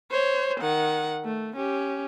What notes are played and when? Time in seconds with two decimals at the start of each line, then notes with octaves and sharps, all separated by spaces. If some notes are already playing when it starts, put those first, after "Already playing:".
0.11 C5 C#5
0.60 D#3 F#5
1.24 A3
1.56 C#4 G4